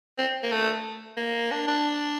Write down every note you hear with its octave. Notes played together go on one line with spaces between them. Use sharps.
C4
A#3
A3
A#3
D4
D4